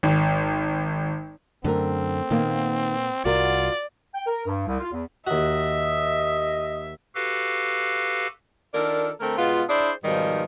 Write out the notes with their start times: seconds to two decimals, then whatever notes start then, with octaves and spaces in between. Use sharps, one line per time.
0.03 G#1
1.64 F#2 D3 A3 C4 A#4
2.31 A#2 D#3 A#3 B3
3.25 C2 F4 F#4 A#4 D5
4.13 G5
4.27 A#4
4.46 G2
4.66 C2
4.80 F4
4.91 E2
5.27 D#2 F#4 D#5 E5
7.15 F#4 G4 A4 B4 F5
8.75 D#3 D4 F4 A4 A#4 D5
9.21 D3 A3 C4 A#4
9.37 B2 G#3 B3 F4
9.69 D4 E4 G#4 C5 D5
10.04 G#2 B2 D#3 F3 G3